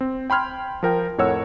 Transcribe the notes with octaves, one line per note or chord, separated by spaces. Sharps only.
C4
G5 B5 C6 F6 G#6
F3 A#4 G5
F2 A2 A#4 C#5 F#5 E6